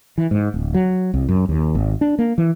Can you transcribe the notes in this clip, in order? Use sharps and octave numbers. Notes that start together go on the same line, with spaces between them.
E3
G#2
D1
F#3
C2
F#2
D#2
G#1
D4
A#3
E3